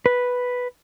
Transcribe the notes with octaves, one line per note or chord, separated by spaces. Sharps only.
B4